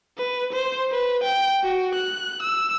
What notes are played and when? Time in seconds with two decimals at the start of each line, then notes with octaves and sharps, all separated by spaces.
0.17 B4
0.53 C5
0.92 B4
1.24 G5
1.64 F#4
1.95 F#6
2.42 E6